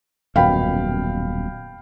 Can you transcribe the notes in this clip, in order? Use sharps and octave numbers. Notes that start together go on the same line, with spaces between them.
D#1 F#2 B2 F5 G5 B5